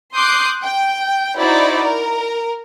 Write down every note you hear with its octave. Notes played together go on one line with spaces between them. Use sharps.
C6 D6 D#6 F#6 G6 C7
G5
D#4 E4 F#4 C5 D5
A#4